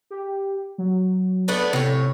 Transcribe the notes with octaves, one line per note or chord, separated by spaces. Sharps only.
G4
F#3
A3 B3 D4
A2 C3 C#5